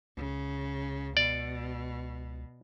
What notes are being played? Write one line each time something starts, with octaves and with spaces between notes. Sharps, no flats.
C#2 C#3
B2 D5